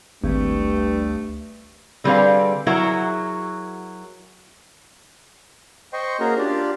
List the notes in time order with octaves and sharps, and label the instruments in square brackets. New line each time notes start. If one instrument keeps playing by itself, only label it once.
[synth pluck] G#1 [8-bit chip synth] D2 [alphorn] G2 [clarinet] A3
[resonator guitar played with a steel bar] D3 G3 C4 G#4 B4 F5
F#3 E4 F#4 G#4 A#4
[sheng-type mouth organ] C5 D#5 G5 C6 C#6
A#3 C#4 F#4 G#4 A#4 A#5
D4 F4 G4 D5